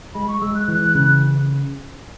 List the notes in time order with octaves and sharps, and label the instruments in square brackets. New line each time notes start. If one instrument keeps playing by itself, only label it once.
[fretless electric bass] G#3 [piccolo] B5
[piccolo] C#6
[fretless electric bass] G#3 [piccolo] E6
[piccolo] F#6
[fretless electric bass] E3 [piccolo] F#6
[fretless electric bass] C#3